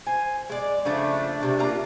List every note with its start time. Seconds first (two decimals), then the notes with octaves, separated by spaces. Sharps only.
0.07 C5 G#5
0.49 G#3 D5
0.85 C#3 F3 A3 D4
1.41 C3 A3
1.59 A#3 F4 A#5